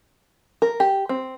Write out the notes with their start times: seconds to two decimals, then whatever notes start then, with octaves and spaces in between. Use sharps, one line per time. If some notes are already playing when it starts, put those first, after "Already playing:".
0.62 A#4
0.80 G4
1.09 C4